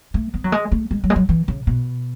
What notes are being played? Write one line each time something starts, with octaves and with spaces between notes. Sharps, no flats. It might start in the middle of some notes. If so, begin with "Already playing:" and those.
A3
B3
F#3
G#3
A3
G#3
F#3
G#3
F#3
E3
C#3
B2